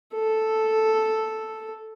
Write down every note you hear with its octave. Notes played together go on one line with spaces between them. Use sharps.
A4